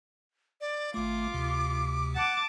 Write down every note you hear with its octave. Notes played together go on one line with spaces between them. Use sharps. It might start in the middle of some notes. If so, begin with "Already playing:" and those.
D5
G#1 A3 F4 D6
D2 C3
F#5 A5 D6